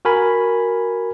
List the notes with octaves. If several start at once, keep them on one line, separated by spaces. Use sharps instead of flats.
F#4 A#4 G#5 B5